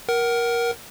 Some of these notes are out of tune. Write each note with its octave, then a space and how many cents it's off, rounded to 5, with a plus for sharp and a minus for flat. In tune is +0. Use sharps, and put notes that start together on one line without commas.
A#4 +15 F#5 +30